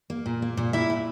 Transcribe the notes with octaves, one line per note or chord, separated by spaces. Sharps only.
A#3
A#2
A#3
A#2
A#2 E4 E5
A#2